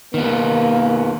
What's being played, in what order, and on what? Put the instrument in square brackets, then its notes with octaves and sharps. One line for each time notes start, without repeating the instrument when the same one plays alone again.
[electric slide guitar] D#3 B3 [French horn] A#3